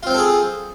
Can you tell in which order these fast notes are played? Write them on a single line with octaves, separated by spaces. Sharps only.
F4 C4 C5 A4 G#4